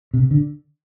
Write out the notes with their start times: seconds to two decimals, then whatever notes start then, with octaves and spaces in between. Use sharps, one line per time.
0.14 C3
0.31 D3